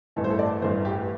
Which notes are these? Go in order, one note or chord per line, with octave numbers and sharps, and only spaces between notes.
A1 G2 E3 A3 A4
C5
A4
D5
A1 G2 E3 A3 C5
G4